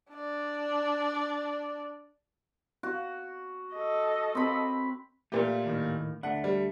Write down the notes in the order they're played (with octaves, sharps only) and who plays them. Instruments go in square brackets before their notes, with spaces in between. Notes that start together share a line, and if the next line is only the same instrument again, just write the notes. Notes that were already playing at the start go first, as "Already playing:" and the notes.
[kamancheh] D4 D5
[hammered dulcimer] F#4
[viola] A4 D#5
[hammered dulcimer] C4 B5
[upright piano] A#2 G4 [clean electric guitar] A3 F4
[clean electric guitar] D#2 A2 D#3
[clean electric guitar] D2 A3 D4 [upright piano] F#5
[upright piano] G3